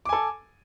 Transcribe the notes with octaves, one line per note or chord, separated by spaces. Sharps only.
A4 G#5 D6